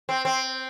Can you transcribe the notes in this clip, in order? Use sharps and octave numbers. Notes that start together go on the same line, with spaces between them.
C4
C4